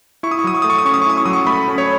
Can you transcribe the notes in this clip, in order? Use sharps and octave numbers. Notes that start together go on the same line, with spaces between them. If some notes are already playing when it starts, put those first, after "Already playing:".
E4 C#6
D#6
C#6
F#3 D#6
C#6
A3 D#6
C#6
D#6
C#4 C#6
D#6
C#6
E4 D#6
C#6
F#3 D#6
C#6
A3 B5
C#4
C#5